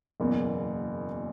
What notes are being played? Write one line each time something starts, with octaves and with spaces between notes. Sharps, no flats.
F#1 E2 B2 A#3